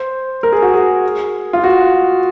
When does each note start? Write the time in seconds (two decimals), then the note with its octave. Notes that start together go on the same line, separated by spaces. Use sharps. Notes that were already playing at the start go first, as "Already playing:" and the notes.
Already playing: C5
0.43 A#4
0.52 G#4
0.62 F#4
0.74 G#4
1.53 F4
1.64 F#4